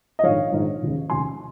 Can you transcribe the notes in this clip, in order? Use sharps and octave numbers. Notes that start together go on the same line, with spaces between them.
D#5
A#1 G#2 D#3 C#5 F5
A#1 G#2 D#3
F1 D#2 C#3
F1 D#2 C#3 G#5 C6